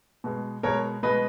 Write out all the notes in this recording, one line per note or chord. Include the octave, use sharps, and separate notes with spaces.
B2 G#3
B2 G#3 A#4 C#5
B2 G#3 B4 D#5